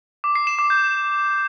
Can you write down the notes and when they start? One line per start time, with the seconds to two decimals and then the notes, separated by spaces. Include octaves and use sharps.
0.24 D6
0.35 C7
0.47 E7
0.59 D6
0.70 G6